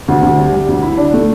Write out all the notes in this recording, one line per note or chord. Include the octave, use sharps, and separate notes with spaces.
D2
D2
G3
G3
D2
E4
D4
A3